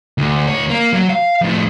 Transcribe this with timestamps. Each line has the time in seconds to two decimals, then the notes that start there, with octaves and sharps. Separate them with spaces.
0.18 D2
0.48 D2 C#5
0.70 A#3
0.93 F#3
1.09 F5
1.41 F2 A2